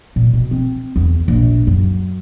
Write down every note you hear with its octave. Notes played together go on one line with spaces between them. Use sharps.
A#2
B2
C4
E2
A#1
F#2